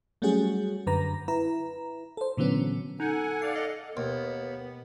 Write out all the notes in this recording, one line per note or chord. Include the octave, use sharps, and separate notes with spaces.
F#3 G3 A3 C#4 F#4 G#4
F#2 D3 B4 A#5 A#6
E4 B4 A#5
A4 C5
A#2 D3 E3 F#3 B3 C#4
D#4 A4 F#5 G#5
D5 F5 F#5 C7
D#5
D#2 B2 B3